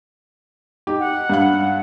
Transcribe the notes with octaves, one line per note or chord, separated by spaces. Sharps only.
D#4 G4
F#5
G2 F5 F#6